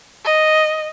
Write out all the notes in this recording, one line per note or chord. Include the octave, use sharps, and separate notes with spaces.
D#5